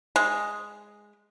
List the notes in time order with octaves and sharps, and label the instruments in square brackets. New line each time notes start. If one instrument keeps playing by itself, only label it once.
[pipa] G#3